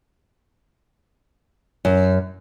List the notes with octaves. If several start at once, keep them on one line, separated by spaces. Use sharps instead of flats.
F#2